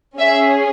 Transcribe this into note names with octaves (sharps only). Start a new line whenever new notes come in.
C#4 G#4 E5